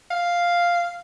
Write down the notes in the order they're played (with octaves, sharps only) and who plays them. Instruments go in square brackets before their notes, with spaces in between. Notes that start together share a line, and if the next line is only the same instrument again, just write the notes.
[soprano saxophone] F5